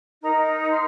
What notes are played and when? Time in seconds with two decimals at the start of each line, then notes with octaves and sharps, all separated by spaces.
0.22 D#4 A#4 A#5
0.69 C6